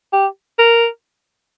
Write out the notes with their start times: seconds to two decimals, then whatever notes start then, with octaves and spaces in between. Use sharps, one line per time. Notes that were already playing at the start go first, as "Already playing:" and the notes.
0.13 G4
0.59 A#4